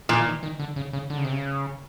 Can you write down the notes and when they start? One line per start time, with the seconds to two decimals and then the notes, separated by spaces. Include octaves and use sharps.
0.09 A#2 E3
0.20 E3
0.26 D#3
0.43 D#3
0.60 D3
0.76 C#3
0.93 C#3
1.10 D3
1.18 C#3
1.25 C3
1.32 C#3